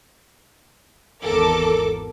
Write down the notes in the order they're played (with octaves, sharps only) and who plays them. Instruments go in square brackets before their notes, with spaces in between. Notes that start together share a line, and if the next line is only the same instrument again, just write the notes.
[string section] G#1 E2 A4 A#4 D6